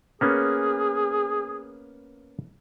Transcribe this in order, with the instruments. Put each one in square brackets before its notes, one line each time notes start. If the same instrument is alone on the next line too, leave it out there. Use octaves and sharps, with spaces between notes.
[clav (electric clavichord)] A#3 B3 C#4 [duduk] G#4